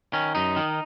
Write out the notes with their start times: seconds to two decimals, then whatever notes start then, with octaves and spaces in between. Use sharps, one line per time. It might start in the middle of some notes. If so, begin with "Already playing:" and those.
0.13 D#3 C#4
0.35 F#2 D#4
0.56 D#3